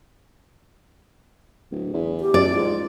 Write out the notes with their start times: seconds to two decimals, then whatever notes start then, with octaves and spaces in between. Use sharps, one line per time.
1.71 D1
1.94 E2
2.21 G4
2.34 F#2 D5
2.54 G#2 F4